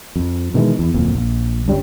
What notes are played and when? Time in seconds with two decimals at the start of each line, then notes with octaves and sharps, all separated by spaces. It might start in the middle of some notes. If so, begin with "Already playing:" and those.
0.16 F2
0.54 B2 D#3 E3 G#3
0.79 E2
0.94 D1 F2 A#2
1.15 A#1
1.66 G1 G2 G3 C#4